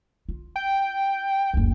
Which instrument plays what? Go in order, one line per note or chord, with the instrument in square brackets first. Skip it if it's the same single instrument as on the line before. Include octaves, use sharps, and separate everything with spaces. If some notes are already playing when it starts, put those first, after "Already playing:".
[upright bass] F4
[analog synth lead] G5
[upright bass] F#1 D2